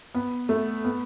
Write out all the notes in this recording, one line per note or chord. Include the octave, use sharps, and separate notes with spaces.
B3
A3
B3